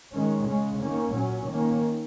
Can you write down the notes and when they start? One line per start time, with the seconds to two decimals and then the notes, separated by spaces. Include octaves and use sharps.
0.13 D#3 G#3 C#4
0.47 C#3 G#3 C#4
0.82 D#3 A#3 C#4
1.15 A#2 F#3 C#4
1.49 D#3 A#3 C#4